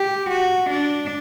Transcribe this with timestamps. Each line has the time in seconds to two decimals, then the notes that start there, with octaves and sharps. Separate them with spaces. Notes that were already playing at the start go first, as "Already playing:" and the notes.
Already playing: G4
0.30 F#4
0.70 D4